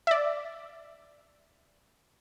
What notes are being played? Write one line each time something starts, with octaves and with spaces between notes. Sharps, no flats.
D5 E5